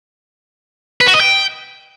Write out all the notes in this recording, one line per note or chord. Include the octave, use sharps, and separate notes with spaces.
B4
F#4
D#5
G5